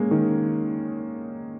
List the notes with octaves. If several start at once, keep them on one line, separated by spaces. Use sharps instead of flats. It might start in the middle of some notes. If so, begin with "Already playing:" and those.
Already playing: G#3 A#3 C#4
D#3